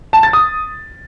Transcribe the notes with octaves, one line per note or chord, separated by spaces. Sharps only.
A5
A6
D#6